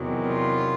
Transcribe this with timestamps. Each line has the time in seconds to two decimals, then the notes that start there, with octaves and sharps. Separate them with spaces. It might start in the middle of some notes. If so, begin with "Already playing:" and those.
Already playing: E2 C3 D#3 F#3
0.28 F4